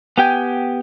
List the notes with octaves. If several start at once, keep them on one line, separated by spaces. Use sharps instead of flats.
B3 G4 G5 G#5